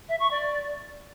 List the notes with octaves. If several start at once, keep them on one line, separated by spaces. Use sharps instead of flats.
E5
C#6
D5